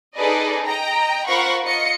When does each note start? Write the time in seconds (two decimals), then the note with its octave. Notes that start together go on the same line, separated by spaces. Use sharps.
0.15 D#4 G#4 A4 B4 D5 D#5
0.64 D#5 G5 A#5
1.26 F4 A#4 C5 F#5 B5 C#6
1.63 F4 D#5 C#7